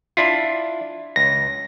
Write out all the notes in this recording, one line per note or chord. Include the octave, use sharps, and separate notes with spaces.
D4 E4 F4
C#2 A#6